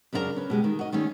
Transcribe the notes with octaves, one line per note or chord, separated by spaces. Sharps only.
F#2 C#3 D4 F4 A#4
C#4 B4
B2 G#3 G4
D#3
F#4 D#5
D#3 G3 A3 C#4